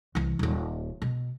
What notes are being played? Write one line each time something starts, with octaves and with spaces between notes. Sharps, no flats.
C2 E3
D#1 D#2
B2